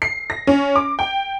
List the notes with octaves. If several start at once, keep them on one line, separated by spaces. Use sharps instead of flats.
C7
A#6
C#4
D6
G5